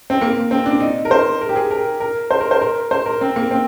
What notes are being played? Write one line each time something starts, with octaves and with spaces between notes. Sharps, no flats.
C4
A#3
C4
D4
D#4
A#4
C5
A#4
G4
G#4
A#4
A#4
C5
A#4
C5
A#4
C5
A#4
C4
A#3
C4